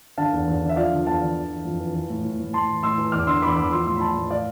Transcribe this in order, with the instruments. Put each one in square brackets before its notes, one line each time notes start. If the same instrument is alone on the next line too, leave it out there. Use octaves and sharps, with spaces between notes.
[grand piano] D3 F5 A5
E2
E2
D3
E5
F3 D5 F5
D3
E2 F5 A5
D3
E3
E3
F2
E3
E3
A2
A2
A2
A2 A5 C6
E3
A2 C6 E6
E3
E2 D6 F6
D3 C6 E6
E2 B5 D6
E6
E2 B5 D6
F3 C6 E6
A2 C6 E6
B5
A2 A5 C6
A2
A2 D5 F5